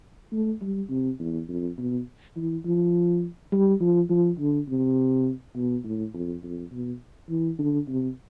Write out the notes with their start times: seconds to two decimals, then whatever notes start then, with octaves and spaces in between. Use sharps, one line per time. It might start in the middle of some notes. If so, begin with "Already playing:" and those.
0.32 A3
0.61 G3
0.90 C3
1.19 E2
1.48 F2
1.78 B2
2.36 E3
2.65 F3
3.52 G3
3.80 F3
4.10 F3
4.39 D3
4.69 C3
5.55 B2
5.84 A2
6.14 F2
6.43 F2
6.72 B2
7.30 E3
7.59 D3
7.88 C3